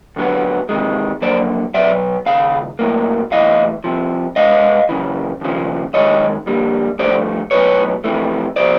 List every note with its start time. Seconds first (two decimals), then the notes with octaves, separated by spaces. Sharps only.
0.16 D2 D3 F#3 B3
0.69 E2 C3 D#3 G#3
1.21 F2 D3 F#3 A#3 C5 D5
1.74 B2 F#3 B3 D5 E5
2.26 D#2 C#3 F5
2.79 B1 A2 F#3 A#3
3.31 B1 A2 E3 D#5 F5
3.84 C2 C3 F3
4.36 B2 G#3 B3 D#5 F5
4.89 F#2 C#3 E3
5.41 D#2 C#3 F3
5.93 F#2 D#3 G#3 C#5 D#5
6.46 F2 D3 G3 A#3
6.99 G2 D3 F3 A3 C5 D5
7.51 B1 A2 F#3 B3 B4 C#5
8.04 F2 C3 E3 A3
8.56 C3 F3 C5 D5